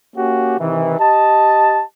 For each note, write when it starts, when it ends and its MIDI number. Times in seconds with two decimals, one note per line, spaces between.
0.16 0.56 58
0.16 0.56 61
0.16 0.56 66
0.16 0.56 67
0.58 0.96 48
0.58 0.96 51
0.58 0.96 52
0.98 1.83 67
0.98 1.83 75
0.98 1.83 81